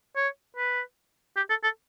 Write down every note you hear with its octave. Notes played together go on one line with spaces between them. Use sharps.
C#5
B4
G4
A4
A4